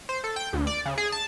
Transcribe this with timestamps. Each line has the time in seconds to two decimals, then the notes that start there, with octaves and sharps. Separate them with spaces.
0.09 C5
0.24 A4
0.36 G5
0.53 D2
0.67 D5
0.86 C#3
0.98 G#4
1.12 A5